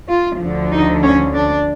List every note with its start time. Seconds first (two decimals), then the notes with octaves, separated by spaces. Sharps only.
0.08 F4
0.39 D2 D3 F3
0.71 D#4
1.01 C#4
1.34 D4